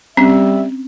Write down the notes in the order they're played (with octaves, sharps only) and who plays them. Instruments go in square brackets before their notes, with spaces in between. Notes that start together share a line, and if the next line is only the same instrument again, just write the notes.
[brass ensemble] G3 E5 [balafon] C4 C#4